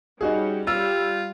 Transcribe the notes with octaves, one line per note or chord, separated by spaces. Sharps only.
G3 C#4 D#4 F#4 G#4
G3 F4 E6